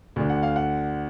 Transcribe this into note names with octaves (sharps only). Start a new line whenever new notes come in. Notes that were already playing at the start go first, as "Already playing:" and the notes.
D2 D3
F#5
F5
F#5